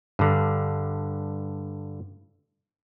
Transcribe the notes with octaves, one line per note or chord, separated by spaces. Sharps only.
G2 D3